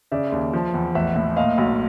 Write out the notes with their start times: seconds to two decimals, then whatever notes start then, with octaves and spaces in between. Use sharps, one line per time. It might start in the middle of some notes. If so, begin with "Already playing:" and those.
0.12 C#3 D5 E5
0.32 D#2
0.53 F3
0.74 E2
0.95 A1 E5 F#5
1.16 A2
1.36 A#2 D#5 F5
1.58 B1